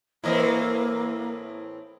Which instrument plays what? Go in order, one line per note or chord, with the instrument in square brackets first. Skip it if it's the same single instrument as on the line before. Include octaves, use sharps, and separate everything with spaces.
[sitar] A2 E3 C4 [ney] A#3 [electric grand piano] E4 A#4 D#5